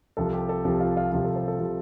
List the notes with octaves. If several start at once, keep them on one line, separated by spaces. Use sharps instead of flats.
C2 C3 F3 A4
G4
A4
C2 C3 F3 G4
F4
F4
C2 C3 F3 F4
A4
C5
A4
C3 F3